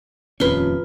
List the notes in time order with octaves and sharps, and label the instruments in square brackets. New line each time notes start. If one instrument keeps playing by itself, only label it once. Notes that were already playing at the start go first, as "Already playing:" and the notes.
[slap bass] D#1 F2 C#4 [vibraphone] F4 [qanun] B4 C6